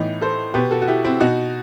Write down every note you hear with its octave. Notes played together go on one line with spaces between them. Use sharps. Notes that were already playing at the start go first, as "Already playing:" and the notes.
Already playing: A2 E3 B3 D#4
A4 C5
B2 G4 B4
F#4 A4
F#4
E4 G4
C4 E4
B2 D#4 F#4